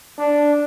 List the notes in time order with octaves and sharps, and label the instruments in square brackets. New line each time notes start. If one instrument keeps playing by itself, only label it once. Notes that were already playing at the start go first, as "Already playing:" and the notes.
[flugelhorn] D4